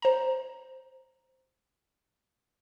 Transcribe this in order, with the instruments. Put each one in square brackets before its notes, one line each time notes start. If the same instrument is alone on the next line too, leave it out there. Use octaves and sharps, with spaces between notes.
[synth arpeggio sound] C5 A#5